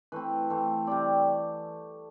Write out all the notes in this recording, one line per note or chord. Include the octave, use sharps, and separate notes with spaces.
E3 A3 C4 B4
E3 A3 C4
C3 G3 C4 D5